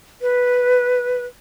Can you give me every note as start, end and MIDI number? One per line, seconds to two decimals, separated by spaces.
0.21 1.25 71